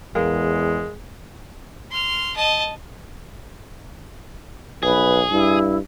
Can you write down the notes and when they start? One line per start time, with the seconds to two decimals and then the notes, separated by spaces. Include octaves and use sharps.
0.15 E2 G#3 A#4 F5 G5
1.91 C6 F6
2.36 D#5 A5
4.83 B1 G#4 B4
5.31 G2 E4